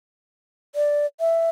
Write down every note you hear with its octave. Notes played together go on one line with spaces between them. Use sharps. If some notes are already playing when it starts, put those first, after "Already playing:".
D5
E5